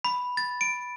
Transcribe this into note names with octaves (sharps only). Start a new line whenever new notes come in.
B5
A6
D7